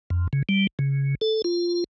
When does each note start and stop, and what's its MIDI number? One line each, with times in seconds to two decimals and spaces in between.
0.10 0.27 41
0.33 0.43 49
0.49 0.67 55
0.79 1.15 49
1.21 1.42 69
1.44 1.84 65